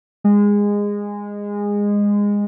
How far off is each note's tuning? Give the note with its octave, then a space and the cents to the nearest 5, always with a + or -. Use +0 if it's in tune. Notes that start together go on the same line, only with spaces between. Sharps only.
G#3 -20